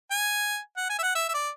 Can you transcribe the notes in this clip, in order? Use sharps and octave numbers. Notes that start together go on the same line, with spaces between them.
G#5
F#5
G#5
E5
F#5
E5
E5
D5